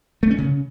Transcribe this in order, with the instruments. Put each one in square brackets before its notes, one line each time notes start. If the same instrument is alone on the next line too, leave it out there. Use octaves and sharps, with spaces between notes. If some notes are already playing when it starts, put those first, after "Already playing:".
[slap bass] A3
C#4
C#3